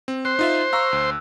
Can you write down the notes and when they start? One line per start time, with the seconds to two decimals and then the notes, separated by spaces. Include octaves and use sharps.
0.08 C4
0.25 C5 F#6
0.39 D#4 F4 E5
0.73 F5 A#5 C#6 E6
0.93 D2